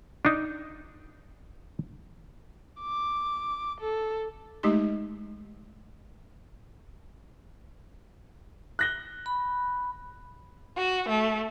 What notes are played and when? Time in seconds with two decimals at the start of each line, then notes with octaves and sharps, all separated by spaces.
0.25 D4 D#4
2.81 D6
3.81 A4
4.63 G#3 A3 D#4 G4 C6
8.79 F#6 A#6 G7
9.26 B5
10.77 F#4
11.09 A3